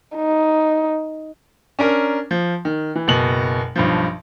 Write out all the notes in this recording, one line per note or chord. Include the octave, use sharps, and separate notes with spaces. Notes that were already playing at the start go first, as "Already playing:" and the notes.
D#4
C#4 D4 A#4 A#5
F3
D#3
E3
F#1 B2 F#7
B1 G2 F3